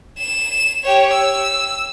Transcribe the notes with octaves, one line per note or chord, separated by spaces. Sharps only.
E7
G4 C#5
E6